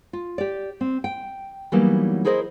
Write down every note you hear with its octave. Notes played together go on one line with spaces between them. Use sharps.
F4
G4 D5
C4
G5
E3 F#3 G3 A#3 B3 D#4
E4 G#4 A#4 C5 D5 D#5